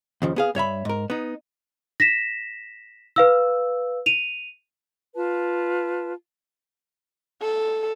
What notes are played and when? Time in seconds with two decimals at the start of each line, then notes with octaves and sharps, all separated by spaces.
0.22 D#2 C#3 F3
0.36 B3 G#4 F5
0.55 G2 C#5 E5 B5
0.85 G#2 A#4
1.10 B3 D#4
2.00 A#6 B6 E7
3.16 B4 F5 E6
4.06 D#7 F7
5.15 F4 B4 A5
7.42 A4